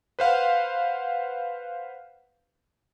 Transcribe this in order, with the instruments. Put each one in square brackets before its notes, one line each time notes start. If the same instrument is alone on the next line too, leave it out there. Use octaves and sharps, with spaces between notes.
[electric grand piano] B4 C5 F5 F#5